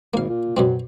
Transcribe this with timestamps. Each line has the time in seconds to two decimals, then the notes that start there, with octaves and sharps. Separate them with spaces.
0.14 G#1 A#3 F5
0.29 A#2
0.57 F#2 B2 F#3 C4